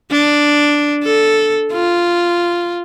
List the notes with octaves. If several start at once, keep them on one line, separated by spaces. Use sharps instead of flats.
D4
A4
F4